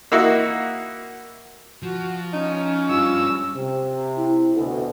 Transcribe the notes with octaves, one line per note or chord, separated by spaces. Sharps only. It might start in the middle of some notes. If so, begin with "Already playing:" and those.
A#3 D#4 E4 F#4
F3 F#4
C#4 D#4
G3 D4 F4 E6
C3
E4
D2 B2 A4